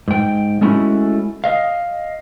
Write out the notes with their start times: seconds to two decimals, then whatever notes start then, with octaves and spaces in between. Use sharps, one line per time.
0.08 G#2 G5
0.61 G#3 A3 C#4 E4 F#4
1.44 D#5 F5